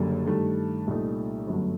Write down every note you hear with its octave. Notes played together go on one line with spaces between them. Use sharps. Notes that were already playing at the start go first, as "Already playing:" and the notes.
Already playing: F#1 F#2 D3 G3 A#3 A4
G2 D#3 A3
C2 A#2 A3 D#4
G1 F#2 F#3 A3